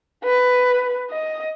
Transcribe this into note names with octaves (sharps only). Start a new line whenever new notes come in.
B4
D#5